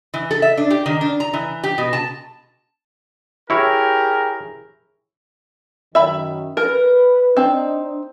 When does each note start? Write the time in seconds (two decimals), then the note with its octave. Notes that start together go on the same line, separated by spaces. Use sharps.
0.14 E3
0.31 A4
0.42 E5
0.57 D4
0.70 G4
0.86 D#3
1.01 D4
1.20 A#5
1.33 E3
1.64 G4
1.78 B2
1.93 A5
3.50 E4 G4 G#4 A#4 C#5
5.95 F#2 D#3 E5 B5
6.57 A#4 B4
7.37 C4 D4 D#4